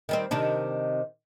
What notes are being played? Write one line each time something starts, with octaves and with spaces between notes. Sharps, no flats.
D#3 G3 C4
C3 D#3 D4